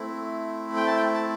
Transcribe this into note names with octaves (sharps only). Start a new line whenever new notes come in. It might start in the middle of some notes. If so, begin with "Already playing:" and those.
Already playing: A3 C4 E4
G5
A5
G5
A5